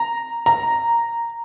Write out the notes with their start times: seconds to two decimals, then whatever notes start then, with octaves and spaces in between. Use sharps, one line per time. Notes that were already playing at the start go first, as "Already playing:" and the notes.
Already playing: A#5
0.46 A#5